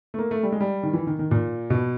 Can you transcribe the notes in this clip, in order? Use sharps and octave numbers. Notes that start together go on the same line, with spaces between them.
A3
A#3
A3
G3
G#3
G3
D#3
E3
D#3
D#3
A#2
B2